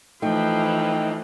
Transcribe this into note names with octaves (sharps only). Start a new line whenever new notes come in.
E3 F3 A3 D#4 G5